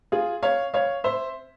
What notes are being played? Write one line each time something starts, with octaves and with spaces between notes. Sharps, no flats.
F4 G#4
C#5 F5
C#5 F5
C5 E5